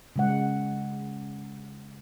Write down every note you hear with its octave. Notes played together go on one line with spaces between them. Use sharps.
C#3 G#3 F#5